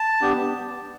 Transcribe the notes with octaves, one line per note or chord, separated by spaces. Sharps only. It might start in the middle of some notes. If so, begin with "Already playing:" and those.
Already playing: A5
B3 D4 G4